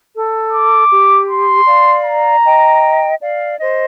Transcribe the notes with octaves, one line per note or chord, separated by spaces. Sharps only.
A4
D6
G4
C6
D5 F5
A#5
D#5 G5
D5 F5
C5 D#5